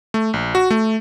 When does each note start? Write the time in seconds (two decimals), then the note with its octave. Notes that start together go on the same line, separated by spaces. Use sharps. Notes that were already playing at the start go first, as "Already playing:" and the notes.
0.14 A3
0.34 A#1
0.55 F#4
0.70 A3